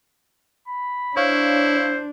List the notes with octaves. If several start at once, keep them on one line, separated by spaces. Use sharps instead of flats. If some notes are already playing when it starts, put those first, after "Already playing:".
B5
D4 E4 C5 C#5 F5